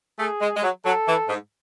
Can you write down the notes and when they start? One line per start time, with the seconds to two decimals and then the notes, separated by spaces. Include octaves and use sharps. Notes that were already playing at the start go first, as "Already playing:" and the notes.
0.19 A3 G#4
0.41 G#3
0.57 G#3
0.63 F#3
0.85 F#3 A4
1.07 E3
1.29 G#2